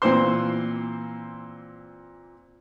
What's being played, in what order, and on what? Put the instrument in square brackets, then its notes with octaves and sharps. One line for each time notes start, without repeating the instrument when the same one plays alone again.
[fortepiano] A#2 E3 C4 C5 C6